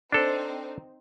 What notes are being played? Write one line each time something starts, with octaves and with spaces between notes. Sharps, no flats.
C4 D4 D#4 A4 C5